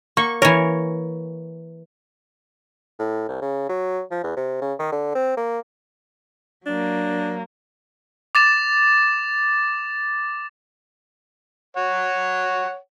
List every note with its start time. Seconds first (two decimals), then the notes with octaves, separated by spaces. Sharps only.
0.17 A#3 C#6
0.42 E3 A#4 C#5
2.99 A2
3.28 C2
3.42 C#3
3.69 F#3
4.11 F3
4.23 E2
4.37 C3
4.61 C#3
4.79 D#3
4.92 D3
5.15 C4
5.37 A#3
6.66 F#3 A#3 D4
8.35 D6 A6 E7
11.77 C#5 F#5